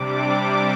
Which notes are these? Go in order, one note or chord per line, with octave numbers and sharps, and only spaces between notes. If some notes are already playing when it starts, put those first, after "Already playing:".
Already playing: C3 G3 D4 D6